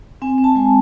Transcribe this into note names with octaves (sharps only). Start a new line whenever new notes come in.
C4 G#5
C4
A5
G#3 G#5